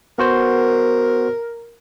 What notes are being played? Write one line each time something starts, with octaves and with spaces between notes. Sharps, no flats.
B3 F#4 A#4 C5